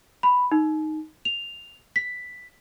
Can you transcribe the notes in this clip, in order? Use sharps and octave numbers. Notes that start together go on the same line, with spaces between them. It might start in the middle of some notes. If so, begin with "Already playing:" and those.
B5
D#4
F7
B6